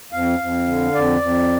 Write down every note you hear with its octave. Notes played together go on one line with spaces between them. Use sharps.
F2 F5
F2
D3
F2 D5
F2